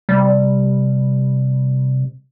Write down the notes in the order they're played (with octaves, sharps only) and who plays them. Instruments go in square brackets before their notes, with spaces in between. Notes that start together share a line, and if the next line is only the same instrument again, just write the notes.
[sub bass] C3 [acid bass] G3